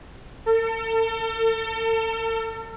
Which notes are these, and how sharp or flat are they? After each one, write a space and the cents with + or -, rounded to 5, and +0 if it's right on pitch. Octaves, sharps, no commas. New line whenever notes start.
A4 +40